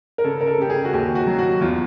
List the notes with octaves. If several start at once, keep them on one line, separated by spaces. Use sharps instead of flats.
A#4
C#3 A4
A#4
A4
C#3 G4
G#4
F#4
D#2 G4
F#4
F#3
F#4
E2 F4